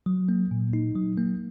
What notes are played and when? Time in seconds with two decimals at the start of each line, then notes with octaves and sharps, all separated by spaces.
0.06 F#3
0.29 A#3
0.51 A#2
0.73 D#4
0.95 F#3
1.17 A#3